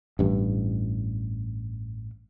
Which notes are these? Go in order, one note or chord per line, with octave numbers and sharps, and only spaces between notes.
A1 G2